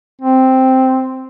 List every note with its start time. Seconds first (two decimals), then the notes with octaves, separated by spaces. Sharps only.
0.21 C4